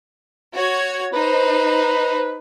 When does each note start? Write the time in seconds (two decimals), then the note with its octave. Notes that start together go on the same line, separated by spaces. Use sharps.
0.54 F#4 C#5 G#6
1.13 D#4 B4 C5